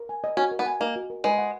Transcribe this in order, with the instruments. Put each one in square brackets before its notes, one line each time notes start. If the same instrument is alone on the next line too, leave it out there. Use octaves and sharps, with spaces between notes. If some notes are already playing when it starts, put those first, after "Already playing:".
Already playing: [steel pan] A#4
G#5
D#5
[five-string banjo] C#4 [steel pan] F#4
[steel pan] A#4
[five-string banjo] B3
[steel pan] G#5
[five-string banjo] A#3 [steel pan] D#5
[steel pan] F#4
A#4
[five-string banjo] G#3 [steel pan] B4
[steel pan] F#5